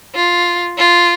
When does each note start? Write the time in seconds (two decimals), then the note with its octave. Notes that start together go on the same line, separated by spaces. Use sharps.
0.15 F4
0.78 F4